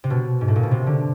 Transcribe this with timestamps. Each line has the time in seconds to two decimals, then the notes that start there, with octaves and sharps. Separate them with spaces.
0.04 C3
0.10 B2
0.41 G#2
0.48 A2
0.56 A#2
0.63 B2
0.71 C3
0.87 D3